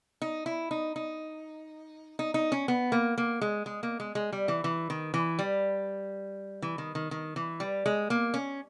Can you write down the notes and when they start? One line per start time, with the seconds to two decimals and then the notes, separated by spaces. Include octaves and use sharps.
0.22 D#4
0.46 E4
0.71 D#4
0.96 D#4
2.19 D#4
2.34 D#4
2.52 C#4
2.68 B3
2.92 A#3
3.18 A#3
3.41 G#3
3.66 G#3
3.83 A#3
4.00 G#3
4.15 G#3
4.33 G3
4.48 E3
4.64 E3
4.90 D#3
5.14 E3
5.39 G3
6.62 E3
6.78 D#3
6.95 D#3
7.11 D#3
7.36 E3
7.60 G3
7.86 G#3
8.10 A#3
8.34 C#4